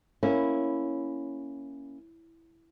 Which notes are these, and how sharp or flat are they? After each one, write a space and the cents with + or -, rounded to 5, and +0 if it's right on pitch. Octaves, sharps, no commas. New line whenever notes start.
A#3 +0 C#4 +0 E4 +0